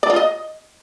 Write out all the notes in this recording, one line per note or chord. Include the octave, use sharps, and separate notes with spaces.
D5
F4
D#5